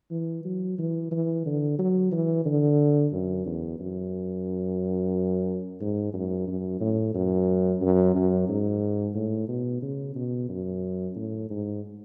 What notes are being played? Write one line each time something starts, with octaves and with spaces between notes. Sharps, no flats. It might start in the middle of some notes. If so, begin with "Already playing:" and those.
E3
F#3
E3
E3
D3
F#3
E3
D3
F#2
E2
F#2
G#2
F#2
F#2
A2
F#2
F#2
F#2
G#2
A2
B2
C#3
B2
F#2
A2
G#2